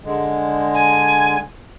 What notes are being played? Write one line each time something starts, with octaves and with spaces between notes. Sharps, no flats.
D3 G#3
G#5